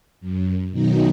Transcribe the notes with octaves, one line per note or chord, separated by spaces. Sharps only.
F#2
B2 D#3 F#3 D#4